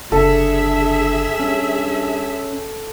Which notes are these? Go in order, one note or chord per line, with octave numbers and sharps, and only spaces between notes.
F#1 D3 G#4 A4 E5
G2 C#4